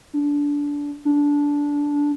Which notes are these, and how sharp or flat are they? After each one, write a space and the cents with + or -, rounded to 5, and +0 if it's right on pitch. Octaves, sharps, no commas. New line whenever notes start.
D4 -20
D4 -15